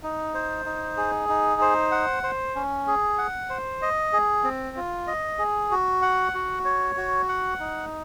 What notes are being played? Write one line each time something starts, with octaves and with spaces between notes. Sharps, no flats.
D#4
C5
D#4
G#4
D#4
C5
F#5
C5
C#4
G#4
F#5
C5
D#5
G#4
C4
F4
D#5
G#4
F#4
F#5
F#4
C#5
F#4
F#5
D#4